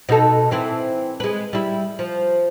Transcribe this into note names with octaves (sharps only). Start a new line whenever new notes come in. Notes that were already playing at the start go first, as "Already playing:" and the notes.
B2 D#4 A4
E3 C4 E4
G#3 B4
G3 E4
F3